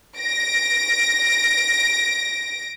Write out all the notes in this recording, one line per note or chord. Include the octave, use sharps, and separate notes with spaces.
A#6 D7